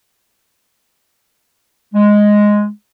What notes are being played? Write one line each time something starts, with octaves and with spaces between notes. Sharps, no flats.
G#3